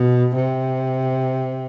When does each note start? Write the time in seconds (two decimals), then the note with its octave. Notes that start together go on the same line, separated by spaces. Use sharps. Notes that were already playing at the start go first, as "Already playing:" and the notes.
Already playing: B2
0.36 C3